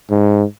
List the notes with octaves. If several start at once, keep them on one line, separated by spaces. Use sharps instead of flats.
G#2